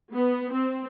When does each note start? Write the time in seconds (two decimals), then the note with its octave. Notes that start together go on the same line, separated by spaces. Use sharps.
0.13 B3
0.52 C4